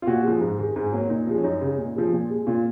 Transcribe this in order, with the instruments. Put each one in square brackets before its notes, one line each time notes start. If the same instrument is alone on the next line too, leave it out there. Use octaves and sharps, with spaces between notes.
[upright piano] F4
A#2 F#4
F3 G#3
G#2
D#3 G#3
G#2 G#4
F#3 A#3
A#2 D#4
F3 G#3
C#4
F#2 D#4
C#3 G#3
A#2
F3 G#3
A#2
G#3
A#2 F4